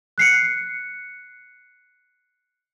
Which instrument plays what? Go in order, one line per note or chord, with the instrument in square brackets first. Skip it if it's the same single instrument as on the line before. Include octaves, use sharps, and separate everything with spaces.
[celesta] F#6 C7 C#7